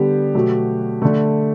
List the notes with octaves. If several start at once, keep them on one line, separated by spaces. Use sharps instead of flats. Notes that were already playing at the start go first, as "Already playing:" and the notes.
Already playing: D3 G3 B3 G4
B2 F#3 A3
D3 A3